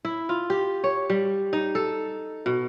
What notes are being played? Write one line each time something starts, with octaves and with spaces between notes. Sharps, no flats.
E4
F4
G4
C#5
G3
D#4
A4
B2